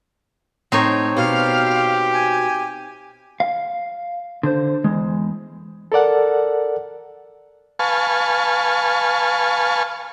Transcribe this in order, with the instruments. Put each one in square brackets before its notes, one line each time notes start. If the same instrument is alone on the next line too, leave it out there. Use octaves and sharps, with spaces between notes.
[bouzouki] A2 [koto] C4 D#4 C#5
[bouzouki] B2 C5 [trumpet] G4 [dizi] F5
[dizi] G#5
[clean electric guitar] F5
D3 C5
E2 G#3
[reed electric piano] A4 A#4 D5 F#5
[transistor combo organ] B4 F5 G#5 A5 C#6